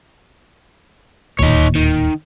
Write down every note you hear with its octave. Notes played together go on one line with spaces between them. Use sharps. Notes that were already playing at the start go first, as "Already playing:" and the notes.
D1 D#2 A#2 D#4 C#5
D#3